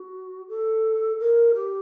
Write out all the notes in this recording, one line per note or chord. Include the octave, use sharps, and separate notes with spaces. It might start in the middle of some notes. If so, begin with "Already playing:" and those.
Already playing: F#4
A4
A#4
G4